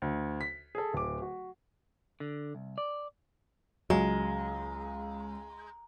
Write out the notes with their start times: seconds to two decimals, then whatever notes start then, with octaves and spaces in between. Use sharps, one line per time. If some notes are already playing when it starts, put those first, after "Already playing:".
0.02 D2
0.41 B6
0.75 G#4 A4
0.93 D1 D6
1.22 F#4
2.20 D3
2.55 C2
2.78 D5
3.90 C#2 F#3 G#3 A#5